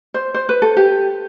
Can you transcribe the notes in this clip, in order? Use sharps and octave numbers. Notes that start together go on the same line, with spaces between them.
C5
C5
B4
A4
G4